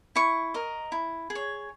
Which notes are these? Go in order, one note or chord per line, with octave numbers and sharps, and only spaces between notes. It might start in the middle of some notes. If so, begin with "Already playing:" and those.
E4 C#6
A#4 D#5
E4
G#4
C#5